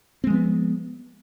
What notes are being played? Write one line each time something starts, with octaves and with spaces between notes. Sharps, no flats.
F3 G#3 B3 C4